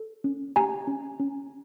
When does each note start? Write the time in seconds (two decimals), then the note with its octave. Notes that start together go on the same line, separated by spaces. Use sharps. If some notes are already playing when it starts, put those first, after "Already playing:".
Already playing: A4
0.24 C#4
0.56 G4 G#5 A#5
0.87 C#4
1.20 C#4